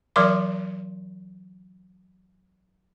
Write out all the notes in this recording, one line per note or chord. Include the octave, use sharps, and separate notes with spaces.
E3 F#3 A#4 D5 C6 D6